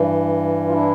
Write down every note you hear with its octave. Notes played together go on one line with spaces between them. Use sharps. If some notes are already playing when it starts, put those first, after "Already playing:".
Already playing: G2 E3
F4
D4 E4